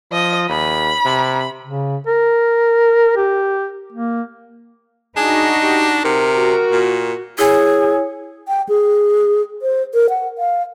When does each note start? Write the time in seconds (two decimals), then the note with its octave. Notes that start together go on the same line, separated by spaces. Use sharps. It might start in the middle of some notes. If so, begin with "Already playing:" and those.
0.12 F3 D#5
0.49 D#2 B5
1.06 C3
1.65 C#3
2.07 A#4
3.16 G4
3.92 A#3
5.17 D4 D#4 F#4 G#4
5.62 G4
6.05 C3 A#4
6.36 F#4
6.72 A#2
7.39 E4 G#4 C#5 G#5
8.48 G5
8.69 G#4
9.62 C5
9.94 A#4
10.09 F#5
10.38 F5